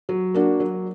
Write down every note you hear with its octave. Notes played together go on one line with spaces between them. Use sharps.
F#3
A#3 D4 F#4
F#3